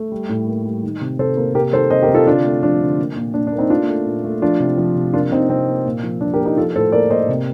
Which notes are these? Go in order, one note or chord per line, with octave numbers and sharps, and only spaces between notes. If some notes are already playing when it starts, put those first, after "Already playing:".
Already playing: A3
G3
A2
A#3
G3
D#3
C3
C3 A4 C5
A#3
C3 G4 A#4
D#3 A4 C5
C3 C5 D#5
G4 A#4
C3
F4 A4
D3 D4 F4
A3
F3 D4
D3
A#3
A#2
A#2 D4
D4
A#3
C4 D#4
A3 D4 F4
A3
A#2
A3
F3 D4 F4
C3
F3
C3
A#3 D4 F4
C3 C4 D#4
C3 C4
A#3
A#2
F3
F3 D4
G4 A#4
A#3
D#4 G4
F3 F4 A4
A2 A4 C5
A#3 A#4 D5
A#3 C5 D#5
C3